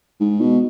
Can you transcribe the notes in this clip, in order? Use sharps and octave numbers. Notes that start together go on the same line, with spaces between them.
G#2
B2